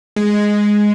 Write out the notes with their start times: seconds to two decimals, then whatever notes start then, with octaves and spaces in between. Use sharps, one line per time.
0.16 G#3